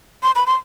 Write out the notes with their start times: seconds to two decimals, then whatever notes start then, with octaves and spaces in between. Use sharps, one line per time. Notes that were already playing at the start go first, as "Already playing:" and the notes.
0.23 C6
0.35 B5
0.46 C6